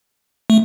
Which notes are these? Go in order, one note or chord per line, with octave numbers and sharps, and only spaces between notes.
A3